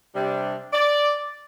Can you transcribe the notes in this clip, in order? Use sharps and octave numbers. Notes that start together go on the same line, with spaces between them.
C3 G3 D4
D5